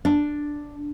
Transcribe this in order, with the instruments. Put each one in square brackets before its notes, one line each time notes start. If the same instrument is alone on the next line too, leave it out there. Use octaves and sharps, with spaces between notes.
[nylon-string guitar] D4